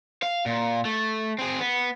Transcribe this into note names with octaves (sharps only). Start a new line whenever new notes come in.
F5
A#2
A3
C4 G#4
B3